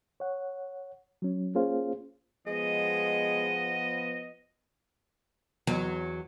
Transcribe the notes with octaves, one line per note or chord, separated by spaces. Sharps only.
C#5 F#5
F#3 C#4
A#3 C#4 F4 G#4 C5 F5
F3 G#3 B3 D#5
E2 F#3